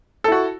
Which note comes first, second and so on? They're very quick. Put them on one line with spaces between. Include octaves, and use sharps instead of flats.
A4 E4 F#4